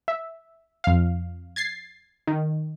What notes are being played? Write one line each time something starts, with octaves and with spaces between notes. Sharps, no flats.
E5
F2 F5
G#6 A6 C7
D#3